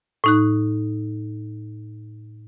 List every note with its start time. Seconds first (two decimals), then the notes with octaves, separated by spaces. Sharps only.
0.24 A2 D#4 F#6